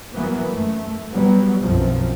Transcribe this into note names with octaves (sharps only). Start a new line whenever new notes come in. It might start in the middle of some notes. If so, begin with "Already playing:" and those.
E3 F#3 A#3 B3
F#2 A3
F#3 G3 B3
B1 F#2 F3 C4